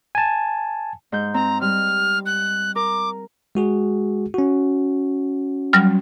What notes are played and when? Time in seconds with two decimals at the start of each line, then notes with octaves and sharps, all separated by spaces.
0.15 G#5 A5
1.12 G#2 G6
1.34 C4 A#5
1.61 G3 F6
2.26 F#6
2.76 A#4 D6
3.55 G#3 F#4 G#4
4.34 C#4 F#4
5.73 F#3 G3 F6